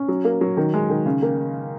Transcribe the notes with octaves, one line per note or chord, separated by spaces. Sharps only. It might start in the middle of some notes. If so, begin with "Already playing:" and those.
Already playing: C#4
F#3
A#3
F#3
D#3
G#3
D#3
C#3
A#3